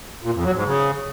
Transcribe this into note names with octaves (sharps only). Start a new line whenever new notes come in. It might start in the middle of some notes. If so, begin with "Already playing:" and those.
A#2
F2
F#3
G#2
C#3